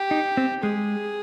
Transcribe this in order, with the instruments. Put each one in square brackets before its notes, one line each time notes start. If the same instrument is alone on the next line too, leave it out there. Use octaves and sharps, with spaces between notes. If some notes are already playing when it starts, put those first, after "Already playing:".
Already playing: [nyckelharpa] G4
[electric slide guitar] D#4
C4
[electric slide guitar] G#3 [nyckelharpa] G#4